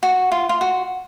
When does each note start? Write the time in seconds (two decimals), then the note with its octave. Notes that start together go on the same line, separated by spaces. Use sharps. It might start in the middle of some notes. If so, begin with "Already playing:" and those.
0.03 F#4
0.32 F4
0.49 F4
0.61 F#4